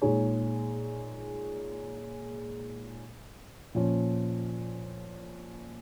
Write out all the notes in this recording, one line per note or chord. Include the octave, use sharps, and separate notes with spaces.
A#2 G#3 D#4 G#4 C#5
A#2 F3 C#4